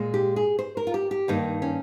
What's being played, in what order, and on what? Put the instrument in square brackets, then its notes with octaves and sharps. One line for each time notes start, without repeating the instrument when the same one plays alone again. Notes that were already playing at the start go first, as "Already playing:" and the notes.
Already playing: [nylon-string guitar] A#2 G#3
G4
G#4
C5
A#4
F4
G4
G4
G2 D#3 A#3 D#4
C#4